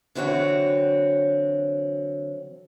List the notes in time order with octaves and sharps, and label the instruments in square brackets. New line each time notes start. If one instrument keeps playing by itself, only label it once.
[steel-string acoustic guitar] D3 E3 F#3 C4 F#4 C#5